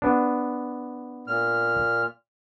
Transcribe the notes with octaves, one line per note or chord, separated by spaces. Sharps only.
B3 D4
A#2 F6